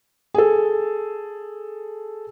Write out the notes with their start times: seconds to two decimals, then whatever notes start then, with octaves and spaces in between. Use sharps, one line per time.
0.34 G#4 A4